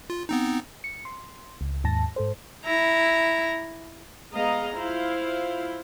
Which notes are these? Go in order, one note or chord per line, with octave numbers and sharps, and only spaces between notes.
F4
B3 C4 D#4
C#7
C6
C#2
D#2 G#2 A5 A#6
G#2 A4 C5
E4 A#5
G#3 B3 D#5 F5 A#5
E4 F4 C5 F5